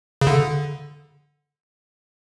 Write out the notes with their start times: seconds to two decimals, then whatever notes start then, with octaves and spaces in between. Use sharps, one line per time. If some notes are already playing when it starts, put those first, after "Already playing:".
0.21 C#3
0.27 D3